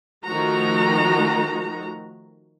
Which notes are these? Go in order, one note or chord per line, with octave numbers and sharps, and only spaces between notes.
D#3 F3 A3 F#4 A#5